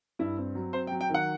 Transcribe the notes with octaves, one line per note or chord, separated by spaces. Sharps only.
G2 E4
C4
F#3
C4 C5
G5
F#3
G5
D#3 F#5